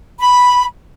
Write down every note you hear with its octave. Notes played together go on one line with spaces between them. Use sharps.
B5